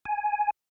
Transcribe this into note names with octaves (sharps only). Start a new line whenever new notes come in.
G#5